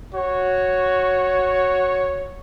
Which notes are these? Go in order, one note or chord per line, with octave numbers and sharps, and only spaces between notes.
F#4 C#5